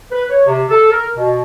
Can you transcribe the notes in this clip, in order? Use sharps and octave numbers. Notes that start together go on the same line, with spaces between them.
B4
C#5
C3
A4
A#4
B2